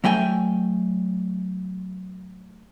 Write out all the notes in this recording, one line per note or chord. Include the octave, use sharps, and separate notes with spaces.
F#3 A3 G5 G#5